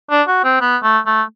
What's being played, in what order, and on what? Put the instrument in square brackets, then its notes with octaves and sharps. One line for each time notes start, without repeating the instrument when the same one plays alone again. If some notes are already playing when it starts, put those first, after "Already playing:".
[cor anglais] D4
F#4
C4
B3
A3
A3